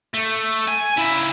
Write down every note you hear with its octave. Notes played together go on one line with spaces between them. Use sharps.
A3
G#5
C#3 E4